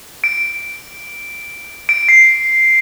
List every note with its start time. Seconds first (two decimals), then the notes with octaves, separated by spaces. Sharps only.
0.24 D7
1.89 D7
2.09 C7